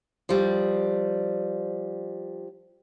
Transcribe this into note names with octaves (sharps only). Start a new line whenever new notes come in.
F3 G3